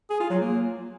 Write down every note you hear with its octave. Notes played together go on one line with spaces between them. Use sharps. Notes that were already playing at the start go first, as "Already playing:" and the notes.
G#4
F4
F#3
A#3